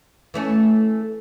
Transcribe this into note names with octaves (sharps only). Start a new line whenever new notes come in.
E3 A3 C#4